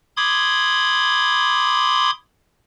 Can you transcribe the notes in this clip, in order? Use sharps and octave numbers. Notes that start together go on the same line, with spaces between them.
B5 C6 D6 D#6 G#6